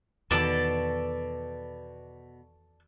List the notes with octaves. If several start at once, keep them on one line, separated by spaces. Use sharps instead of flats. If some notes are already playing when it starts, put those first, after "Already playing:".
E2 B2 D#3 A4 D5 A5